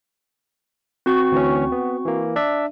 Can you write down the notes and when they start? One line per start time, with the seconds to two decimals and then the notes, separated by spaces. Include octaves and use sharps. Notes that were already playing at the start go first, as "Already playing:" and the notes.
1.06 C4 F#4 C#6
1.32 D2 E3 C#4
1.72 B3
2.05 E3 A#3
2.36 D4 D5 E5